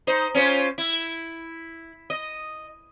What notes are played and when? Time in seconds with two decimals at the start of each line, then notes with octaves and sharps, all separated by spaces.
0.07 D#4 C5
0.35 C#4 F4 C5
0.78 E4
2.10 D#5